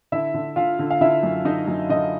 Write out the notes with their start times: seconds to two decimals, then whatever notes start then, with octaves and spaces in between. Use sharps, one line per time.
0.12 D3 E4 E5
0.34 D3
0.56 D3 F4 F5
0.79 D3
0.90 F5
1.01 D3 E4 E5
1.23 F#2
1.45 D3 D#4 D#5
1.67 F#2
1.90 D3 D#4 D#5